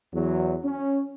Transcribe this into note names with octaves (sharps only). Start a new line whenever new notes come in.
E2 F#3
C#4